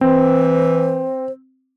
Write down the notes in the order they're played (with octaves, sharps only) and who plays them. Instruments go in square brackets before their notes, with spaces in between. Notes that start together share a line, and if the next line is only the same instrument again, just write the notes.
[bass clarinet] E3 [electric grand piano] C4 [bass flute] C5